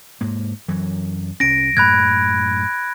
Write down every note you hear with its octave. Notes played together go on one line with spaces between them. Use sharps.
G#2 A#3
F#2 E3 F#3
C2 C#4 A#6 D7
F#2 A2 B5 F#6 G#6